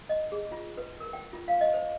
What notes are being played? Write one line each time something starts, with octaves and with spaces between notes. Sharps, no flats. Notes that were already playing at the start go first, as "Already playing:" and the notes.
D#5
G#4
F4
B4
A#4
G5
F4
F5
D#5
C5